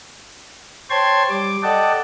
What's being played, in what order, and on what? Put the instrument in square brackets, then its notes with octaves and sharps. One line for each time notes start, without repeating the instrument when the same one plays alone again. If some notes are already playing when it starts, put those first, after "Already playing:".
[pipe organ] C5 C#5 G5 A5 C6 G#6
G3 D6
A4 D5 D#5 F#5 G5 A5